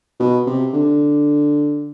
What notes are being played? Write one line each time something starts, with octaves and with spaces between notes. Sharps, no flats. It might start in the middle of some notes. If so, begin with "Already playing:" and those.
B2
C3
D3